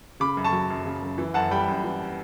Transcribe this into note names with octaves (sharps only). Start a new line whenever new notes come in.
C#3 B5 D6
F#2
A5 C#6
F#3
F#2
C#3
F#2
E3
F#2 F#5 A5
G3 G5 B5
F#2
E3